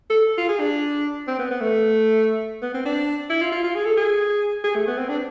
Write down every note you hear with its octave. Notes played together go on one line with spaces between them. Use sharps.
A4
F4
G#4
D4
C4
B3
B3
A3
B3
C4
D4
E4
F4
F4
F4
G#4
A4
G#4
G#4
A3
B3
C4
D4